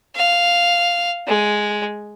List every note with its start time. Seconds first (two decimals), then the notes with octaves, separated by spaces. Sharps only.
0.16 F5
1.27 G#3